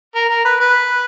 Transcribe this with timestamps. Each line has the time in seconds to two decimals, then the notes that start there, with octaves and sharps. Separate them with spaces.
0.15 A#4
0.29 A#4
0.45 B4
0.60 B4